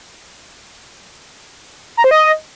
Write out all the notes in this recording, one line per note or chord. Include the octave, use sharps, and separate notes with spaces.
A#5
C5
D#5